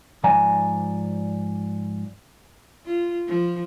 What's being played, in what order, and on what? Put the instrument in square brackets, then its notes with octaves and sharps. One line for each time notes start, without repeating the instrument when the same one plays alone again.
[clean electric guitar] G#2 F3 D5 G#5 A#5
[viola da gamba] F4
F3